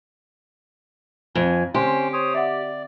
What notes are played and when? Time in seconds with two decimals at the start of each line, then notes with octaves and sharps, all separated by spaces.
1.35 F2 G#5
1.74 D3 C4 C#4 G4 C5 C6
2.13 C5 C#5 D#6
2.34 D5 E5 F#5